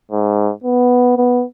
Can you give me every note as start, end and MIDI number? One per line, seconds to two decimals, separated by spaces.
0.11 0.52 44
0.64 1.14 59
1.17 1.43 59